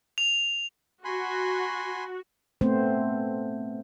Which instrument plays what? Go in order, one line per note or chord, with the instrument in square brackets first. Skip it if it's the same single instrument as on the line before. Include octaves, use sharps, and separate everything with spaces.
[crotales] F7
[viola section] F#4 [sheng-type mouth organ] G#5 B5 C6
[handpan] A3 B3 C4 C5